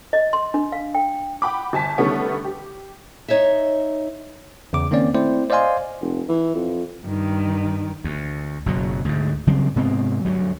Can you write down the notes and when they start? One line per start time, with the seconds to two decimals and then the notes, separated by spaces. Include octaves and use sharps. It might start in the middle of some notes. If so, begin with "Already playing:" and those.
0.13 D#5
0.33 C6
0.54 D4
0.72 F5
0.95 G5
1.42 F#5 G5 B5 D6
1.73 G1 G#5 A5 B6
1.98 D3 D#3 G3 A3 B3 C#4
2.45 G4
3.28 D#4 C#5 D#5 E5
4.73 E2 C#3 D6
4.91 D#3 A#3 C4 C#4 D5
5.14 A3 C4 E4 C5 D5
5.50 C5 D5 D#5 F5 G#5 C6
6.01 F1
6.28 E3
6.55 F2
7.05 G2 D#3
8.04 D2
8.66 F#1 B2 F#3
9.05 D2 G#2
9.47 C#3 F#3 G3 C4
9.76 G#2 C3 B3 C4
10.25 D2 G2 F#3